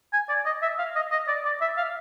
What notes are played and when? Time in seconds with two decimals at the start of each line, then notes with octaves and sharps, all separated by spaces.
0.13 G#5
0.29 D5
0.46 D#5
0.62 E5
0.79 F5
0.96 D#5
1.12 D#5
1.28 D5
1.45 D5
1.61 E5
1.77 F5